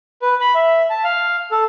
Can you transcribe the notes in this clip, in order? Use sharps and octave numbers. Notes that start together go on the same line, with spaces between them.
B4
B5
E5
A5
F5
A4